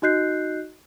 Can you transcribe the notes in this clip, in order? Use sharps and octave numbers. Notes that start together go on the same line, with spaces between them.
D#4 F#4 D#5 F#6 G6 C7